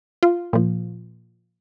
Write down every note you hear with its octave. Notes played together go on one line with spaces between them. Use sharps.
F4
A#2 F3